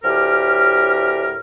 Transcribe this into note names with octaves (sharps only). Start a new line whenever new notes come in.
D2 A2 G4 A#4 F6